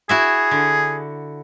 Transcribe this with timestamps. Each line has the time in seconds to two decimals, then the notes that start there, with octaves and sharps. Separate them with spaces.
0.09 E4 F#4 G#4 E5
0.51 D3